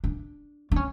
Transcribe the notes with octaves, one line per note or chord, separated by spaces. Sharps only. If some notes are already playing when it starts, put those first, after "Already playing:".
D4
D4
C#4